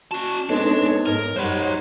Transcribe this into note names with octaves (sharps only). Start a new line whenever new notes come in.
C#4 F#4 A5
G#3 B3 C4 D4 D#4 A4 C#5
G#2 A#4
F#2 G3 D#4 C5 C#5 F#5 B5